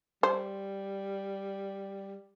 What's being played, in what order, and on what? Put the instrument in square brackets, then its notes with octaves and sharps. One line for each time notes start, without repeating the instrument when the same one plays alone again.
[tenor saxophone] G3 [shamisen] C5